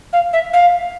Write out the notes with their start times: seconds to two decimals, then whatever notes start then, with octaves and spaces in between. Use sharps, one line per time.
0.13 F5
0.33 E5
0.53 F5